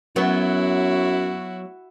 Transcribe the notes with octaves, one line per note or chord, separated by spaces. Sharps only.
F#2 F#3 B3 E4 F#4